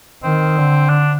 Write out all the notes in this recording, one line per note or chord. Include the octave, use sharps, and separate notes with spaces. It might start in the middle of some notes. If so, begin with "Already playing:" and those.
D#3 C4
D3
D4